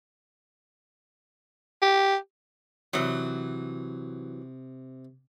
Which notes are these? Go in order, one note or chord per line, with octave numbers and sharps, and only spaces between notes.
G4
C3 E3 F#3 D#6